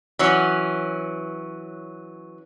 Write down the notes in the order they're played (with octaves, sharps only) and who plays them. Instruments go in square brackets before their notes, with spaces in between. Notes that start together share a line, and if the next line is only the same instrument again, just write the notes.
[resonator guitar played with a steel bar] E3 F#3 C#4